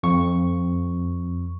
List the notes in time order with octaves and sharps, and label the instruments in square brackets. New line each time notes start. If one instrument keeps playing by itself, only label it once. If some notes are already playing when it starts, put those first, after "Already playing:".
[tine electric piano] F2 C#6